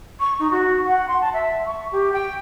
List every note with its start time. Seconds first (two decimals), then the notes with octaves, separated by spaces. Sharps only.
0.20 C#6
0.39 D#4
0.51 F#4
0.86 F#5
1.08 C6
1.21 A5
1.33 E5
1.66 C#6
1.91 G4
2.12 G5